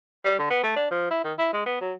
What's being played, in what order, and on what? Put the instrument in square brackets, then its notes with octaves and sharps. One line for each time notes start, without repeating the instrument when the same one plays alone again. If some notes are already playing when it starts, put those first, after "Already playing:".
[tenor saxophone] G3
D3
B3
A3
D4
F3
E4
D#3
E4
G#3
B3
F#3